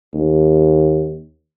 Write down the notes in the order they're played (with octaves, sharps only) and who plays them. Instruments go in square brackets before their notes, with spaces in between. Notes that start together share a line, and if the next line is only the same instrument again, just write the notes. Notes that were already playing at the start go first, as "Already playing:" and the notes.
[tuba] D#2